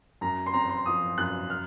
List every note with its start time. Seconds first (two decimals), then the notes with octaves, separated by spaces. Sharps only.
0.21 F#2 A#5
0.46 C6
0.54 C4 A#5
0.69 C6
0.86 F3 D#6
1.18 F#2 F#6
1.50 F6